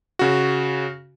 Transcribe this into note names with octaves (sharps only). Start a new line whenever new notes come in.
C#3 F#4